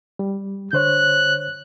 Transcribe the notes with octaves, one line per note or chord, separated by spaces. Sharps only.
G3
D3 C5 C#5 F#6